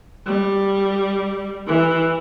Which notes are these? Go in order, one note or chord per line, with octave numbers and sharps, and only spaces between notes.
G3
E3